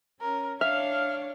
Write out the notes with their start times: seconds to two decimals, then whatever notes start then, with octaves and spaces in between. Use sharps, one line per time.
0.21 C#4 A#4
0.61 D4 C#5 E5 F5 F6